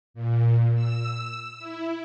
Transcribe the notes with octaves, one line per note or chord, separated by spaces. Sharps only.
A#2
E6
E4